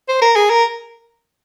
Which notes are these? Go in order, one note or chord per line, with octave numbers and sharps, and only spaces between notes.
C5
A#4
G#4
A#4